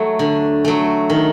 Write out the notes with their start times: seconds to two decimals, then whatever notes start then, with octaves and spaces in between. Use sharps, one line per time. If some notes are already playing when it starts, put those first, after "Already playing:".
Already playing: F#3 A3
0.19 D3
0.65 F#3 A3
1.10 D#3